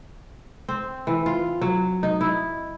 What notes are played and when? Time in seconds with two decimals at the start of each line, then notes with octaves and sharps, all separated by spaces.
0.69 C4
1.07 E3
1.26 F4
1.62 F#3
2.03 D#4
2.21 E4